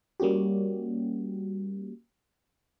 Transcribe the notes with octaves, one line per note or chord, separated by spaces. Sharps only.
G3 A#3 C#4 F#4 G4